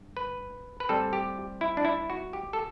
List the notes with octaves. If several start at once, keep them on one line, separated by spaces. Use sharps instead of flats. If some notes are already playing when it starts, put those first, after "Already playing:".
Already playing: G2
B4
B4
A2 G3 C4 A4
G4
E4
D4
E4
F#4
G4
A4